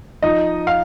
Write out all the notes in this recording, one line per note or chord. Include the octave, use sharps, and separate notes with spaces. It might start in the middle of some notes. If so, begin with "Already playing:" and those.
F3 D#4 D#5
F5